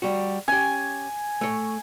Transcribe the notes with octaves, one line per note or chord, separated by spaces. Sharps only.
G3 F#4
C#4 G4 G#5
A3 C#5